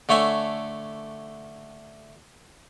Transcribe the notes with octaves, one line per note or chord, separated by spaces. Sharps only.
D3 A3 C#5 E5 G#5